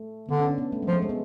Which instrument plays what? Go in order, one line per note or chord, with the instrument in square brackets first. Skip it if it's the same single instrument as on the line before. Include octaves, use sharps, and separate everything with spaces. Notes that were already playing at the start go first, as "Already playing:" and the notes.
Already playing: [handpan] A3
[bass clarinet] D3 [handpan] B3
[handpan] C#4
D4
B3
A3
G#3
[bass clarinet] F3 [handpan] A3
[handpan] G#3
B3